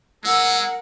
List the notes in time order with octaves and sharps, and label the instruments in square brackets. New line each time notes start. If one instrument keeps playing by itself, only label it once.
[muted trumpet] G#3 [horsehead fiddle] A#4 F#5 [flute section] E6